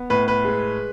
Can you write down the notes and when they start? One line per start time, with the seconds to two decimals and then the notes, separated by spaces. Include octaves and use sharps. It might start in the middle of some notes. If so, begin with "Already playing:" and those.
Already playing: B3
0.10 A2 B4
0.28 B4
0.45 G#3